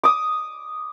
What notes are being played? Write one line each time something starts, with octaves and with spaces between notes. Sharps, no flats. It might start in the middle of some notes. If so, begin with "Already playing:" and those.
D6 D#6